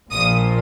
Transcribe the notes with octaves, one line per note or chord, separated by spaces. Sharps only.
A#1 A#2 F3 D#6